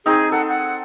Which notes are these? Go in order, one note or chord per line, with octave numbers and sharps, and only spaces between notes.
C4 D#4 G#4
A4 F#5
F#5